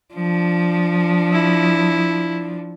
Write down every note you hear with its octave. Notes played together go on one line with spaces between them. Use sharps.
F3 D4
E4